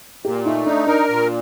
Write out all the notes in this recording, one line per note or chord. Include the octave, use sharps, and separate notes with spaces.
A#2 G4
A3 D#4
D4 D#4
D4 A#4
A#2